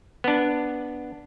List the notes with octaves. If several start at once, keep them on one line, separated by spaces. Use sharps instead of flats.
B3 D4